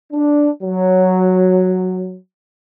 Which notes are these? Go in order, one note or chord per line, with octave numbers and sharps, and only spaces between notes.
D4
F#3